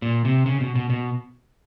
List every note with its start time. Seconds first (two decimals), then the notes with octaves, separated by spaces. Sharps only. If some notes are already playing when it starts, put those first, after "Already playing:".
0.02 A#2
0.25 C3
0.46 C#3
0.60 B2
0.75 B2
0.90 B2